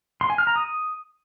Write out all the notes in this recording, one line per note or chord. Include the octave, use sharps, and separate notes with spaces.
C6
G#5
F6
A#5
D#6